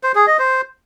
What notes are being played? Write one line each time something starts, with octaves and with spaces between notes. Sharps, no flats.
C5
G#4
D#5
C5